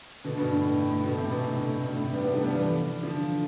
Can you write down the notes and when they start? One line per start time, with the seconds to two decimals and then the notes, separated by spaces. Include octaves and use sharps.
0.24 B2 D3
0.38 G2 B2
0.51 A2
0.64 A2
0.78 A2
0.91 A2
1.04 G2 B2
1.17 A2 C3
1.30 G2 B2
1.44 A2
1.64 A2
1.84 G2
1.93 A2
2.04 A2 C3
2.13 G3 B3
2.23 B3 D4
2.33 F3 A3
2.43 G3 B3
2.53 E3 G3
3.02 D3 F3